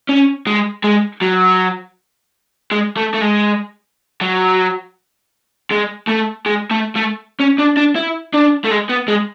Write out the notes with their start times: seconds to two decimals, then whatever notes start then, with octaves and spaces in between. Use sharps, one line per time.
0.09 C#4
0.47 G#3
0.84 G#3
1.21 F#3
2.72 G#3
2.97 A3
3.14 A3
3.21 G#3
4.21 F#3
5.71 G#3
6.09 A3
6.46 G#3
6.71 A3
6.95 A3
7.40 C#4
7.58 D4
7.77 D4
7.96 E4
8.34 D4
8.65 A3
8.72 G#3
8.90 B3
9.08 G#3